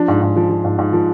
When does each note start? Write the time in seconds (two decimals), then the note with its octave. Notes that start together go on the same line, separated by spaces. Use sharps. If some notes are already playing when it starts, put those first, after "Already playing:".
Already playing: F3 D4
0.08 G#2
0.22 G#2
0.36 F3
0.50 F3
0.64 G#2
0.78 G#2
0.93 F3